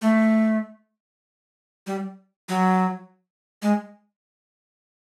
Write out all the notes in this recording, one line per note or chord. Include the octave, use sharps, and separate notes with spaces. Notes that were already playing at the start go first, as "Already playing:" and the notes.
A3
G3
F#3
G#3